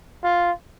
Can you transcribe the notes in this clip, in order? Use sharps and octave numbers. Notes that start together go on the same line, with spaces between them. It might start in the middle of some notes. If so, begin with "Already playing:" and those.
F4